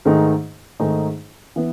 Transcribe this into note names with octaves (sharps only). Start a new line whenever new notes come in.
G#2 D#3 A3 D#4 G#4
G#2 D#3 A3 D#4 G#4
E3 B3